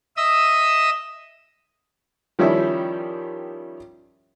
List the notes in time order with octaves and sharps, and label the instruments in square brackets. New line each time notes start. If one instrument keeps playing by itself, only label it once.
[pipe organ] D#5 E5 D#6 E6
[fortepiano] D#3 F3 G3 C#4 E4